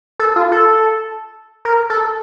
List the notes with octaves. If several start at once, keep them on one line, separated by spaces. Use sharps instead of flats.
A4
F4
A4
A#4
A4